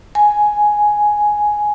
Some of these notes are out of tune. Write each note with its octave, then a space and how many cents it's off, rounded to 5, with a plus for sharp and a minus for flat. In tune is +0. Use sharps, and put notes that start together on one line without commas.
G#5 +5